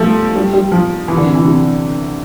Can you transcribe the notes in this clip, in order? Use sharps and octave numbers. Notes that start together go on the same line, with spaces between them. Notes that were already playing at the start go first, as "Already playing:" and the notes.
Already playing: F3 G3 A3
G3
G3
F3
E3
D3
C3
E3
C3